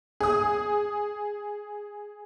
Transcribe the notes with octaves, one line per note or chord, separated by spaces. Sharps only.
G#4 D#6